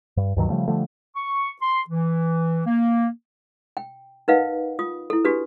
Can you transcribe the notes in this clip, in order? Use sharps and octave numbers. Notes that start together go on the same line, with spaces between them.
G2
D2 G2 D#3 F#3
C#3 F3 G3 A3
D3 F3 G3 A3
C#6
C6
E3
A#3
G5
D#4 A#4 B4 D#5 F5 F#5
F4 D#6
E4 A4
D4 F#4 G4 A4 B4